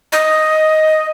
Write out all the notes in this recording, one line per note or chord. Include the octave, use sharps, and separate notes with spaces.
D#5